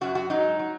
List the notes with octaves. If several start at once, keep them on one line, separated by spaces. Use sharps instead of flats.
F#2 F#3 F#4
F#4
G#2 F#3 D#4
F#3